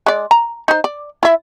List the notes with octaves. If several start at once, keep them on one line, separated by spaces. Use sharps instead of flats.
G#3 D5
A#5
D#4 C5
D5
E4 E5